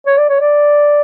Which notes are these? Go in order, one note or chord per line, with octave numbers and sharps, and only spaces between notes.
C#5
D5
C#5
D5